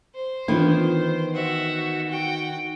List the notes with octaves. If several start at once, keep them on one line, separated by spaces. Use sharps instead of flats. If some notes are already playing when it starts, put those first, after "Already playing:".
C5
D#3 E3 B3 D4 F4
F#4 E5
F#4 G5